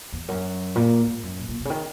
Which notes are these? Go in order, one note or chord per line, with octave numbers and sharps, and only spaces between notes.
E2
F#2
A#2
G#2
F#2
A#2
A#2
B2
C#3
D#3